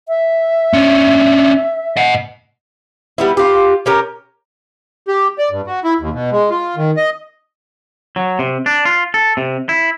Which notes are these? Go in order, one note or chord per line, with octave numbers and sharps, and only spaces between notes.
E5
C#4 D4
D#5 F#5
G3 B3 E4
F4 G4
C#4 G4 A#4
G4
D5
G2
F#4
E4
D#2
B2
G#3
F4
D#3
D#5
F#3
C3
D4
F4
A4
C3
E4